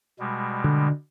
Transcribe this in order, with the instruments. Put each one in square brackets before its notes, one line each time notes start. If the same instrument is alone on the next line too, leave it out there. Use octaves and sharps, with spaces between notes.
[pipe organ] B2 G3 G#3
[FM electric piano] D3